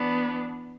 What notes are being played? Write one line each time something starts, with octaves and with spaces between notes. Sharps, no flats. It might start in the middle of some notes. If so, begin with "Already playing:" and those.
Already playing: E3 B3 D4